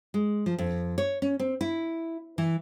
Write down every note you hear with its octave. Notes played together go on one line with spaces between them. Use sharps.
G#3
F3
F2
C#5
C#4
C4
E4
E3